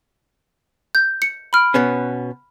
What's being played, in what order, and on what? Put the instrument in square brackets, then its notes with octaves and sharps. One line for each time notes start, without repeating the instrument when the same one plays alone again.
[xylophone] G6
C#7
B5 F6 D7
[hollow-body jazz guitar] B2 B3 C#4